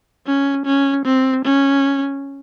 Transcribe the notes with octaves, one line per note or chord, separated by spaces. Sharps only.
C#4
C#4
C4
C#4